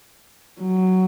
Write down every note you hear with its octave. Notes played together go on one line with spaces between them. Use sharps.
F#3